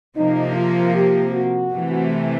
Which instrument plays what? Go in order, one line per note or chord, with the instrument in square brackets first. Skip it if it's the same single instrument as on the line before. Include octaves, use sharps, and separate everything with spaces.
[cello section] C3 F3 A#3 [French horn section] D#4
[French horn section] F4
G4
F#4
[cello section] C3 E3 A3